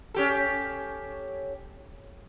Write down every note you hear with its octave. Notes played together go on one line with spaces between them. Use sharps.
C#4 G4 A4